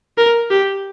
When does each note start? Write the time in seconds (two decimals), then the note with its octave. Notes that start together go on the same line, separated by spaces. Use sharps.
0.18 A#4
0.50 G4